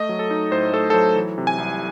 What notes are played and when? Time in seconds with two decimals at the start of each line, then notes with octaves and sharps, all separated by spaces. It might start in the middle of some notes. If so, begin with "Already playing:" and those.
Already playing: A3 D#5
0.09 F#3
0.19 A4
0.31 D#4
0.51 A2 C5
0.72 A3 A4
0.90 A4
0.94 F#3 C5
1.15 E3
1.38 C3
1.47 G#5
1.58 C2